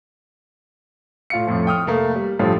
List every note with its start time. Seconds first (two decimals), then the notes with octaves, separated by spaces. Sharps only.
1.30 A2 F4 F5 C#7
1.47 F2 A2 F3
1.67 G5 D#6 F6
1.86 F1 A3 A#3
2.15 G3
2.39 A1 G2 F3 G3 F4 A4